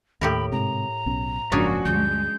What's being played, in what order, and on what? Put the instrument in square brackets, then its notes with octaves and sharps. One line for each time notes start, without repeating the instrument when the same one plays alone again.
[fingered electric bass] D#2 [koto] A2 G4 A#4 [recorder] B5
[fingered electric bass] G#2 C3 [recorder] A#5
[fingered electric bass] B1 B2 C#4
[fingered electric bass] F#1 G#2 [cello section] F3 A#3 F#4 [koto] C#4 D4 G#4
[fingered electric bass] D2 G2 [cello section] G#3 [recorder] G6